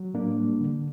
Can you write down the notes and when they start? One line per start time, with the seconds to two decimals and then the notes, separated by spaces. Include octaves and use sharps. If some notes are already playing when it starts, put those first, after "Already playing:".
Already playing: F#3
0.14 A2 A#3 D4
0.38 G3
0.60 D3